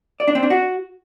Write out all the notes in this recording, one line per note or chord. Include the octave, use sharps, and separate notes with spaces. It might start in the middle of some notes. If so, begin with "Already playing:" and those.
D5
D4
C4
D4
F#4